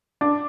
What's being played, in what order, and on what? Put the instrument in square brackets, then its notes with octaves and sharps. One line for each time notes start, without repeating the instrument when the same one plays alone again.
[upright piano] D4